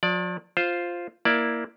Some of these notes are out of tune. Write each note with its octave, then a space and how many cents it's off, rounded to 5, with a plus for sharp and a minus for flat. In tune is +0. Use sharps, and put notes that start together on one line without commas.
F3 +45 D5 +0
F4 +0 C5 +0
A#3 +10 E4 +0 D5 +5